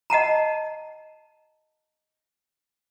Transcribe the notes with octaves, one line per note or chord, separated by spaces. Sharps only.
D#5 F#5 A5 A#5